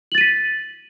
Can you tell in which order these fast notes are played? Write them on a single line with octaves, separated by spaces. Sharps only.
F#7 A6 D#7 B6